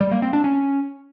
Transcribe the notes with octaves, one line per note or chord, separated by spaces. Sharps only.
G3
A#3
C4
D4
C#4